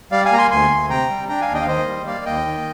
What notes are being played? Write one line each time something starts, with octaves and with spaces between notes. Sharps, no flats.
G3 D5 F5
F5 G#5
A#3 A#5
G#5 C6
D2 G#5 C6
D2
C3 G5 A#5
G3
D4 G5 A#5
F5 G#5
D#2
D#5 G5
F5
D#3 C5 D#5
G3
A#3 D5 F5
D#2 D#5 G5
D#3